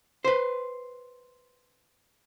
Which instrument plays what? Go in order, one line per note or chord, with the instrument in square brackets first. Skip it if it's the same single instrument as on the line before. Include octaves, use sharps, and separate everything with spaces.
[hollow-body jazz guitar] B4 C5